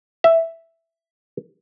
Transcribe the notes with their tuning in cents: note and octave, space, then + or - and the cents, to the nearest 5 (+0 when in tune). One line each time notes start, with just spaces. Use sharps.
E5 +0